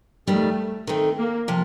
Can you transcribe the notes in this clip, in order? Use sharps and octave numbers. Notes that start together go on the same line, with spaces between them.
F2 D#3 G3 A3
D#3 A3 C4
A#3
C3 F3